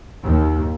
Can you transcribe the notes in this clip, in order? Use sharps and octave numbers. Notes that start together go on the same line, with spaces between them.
D#2